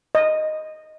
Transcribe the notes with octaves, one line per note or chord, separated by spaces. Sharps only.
D#5